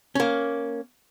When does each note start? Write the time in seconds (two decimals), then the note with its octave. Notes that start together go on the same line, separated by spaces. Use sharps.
0.15 A#3 C#4